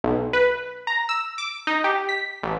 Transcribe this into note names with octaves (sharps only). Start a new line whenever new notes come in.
B1
B4
A#5
E6
D6
D#4
G4
B6
A1